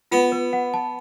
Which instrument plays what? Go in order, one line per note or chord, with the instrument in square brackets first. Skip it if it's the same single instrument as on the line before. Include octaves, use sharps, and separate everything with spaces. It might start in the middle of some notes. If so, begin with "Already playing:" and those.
[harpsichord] B3 [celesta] F4
[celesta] B4
F#5
A5